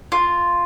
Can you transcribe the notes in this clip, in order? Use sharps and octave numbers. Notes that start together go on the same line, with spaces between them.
F4